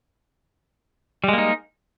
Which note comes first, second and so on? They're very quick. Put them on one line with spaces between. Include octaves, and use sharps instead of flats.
G3 G#3 A#3 D#4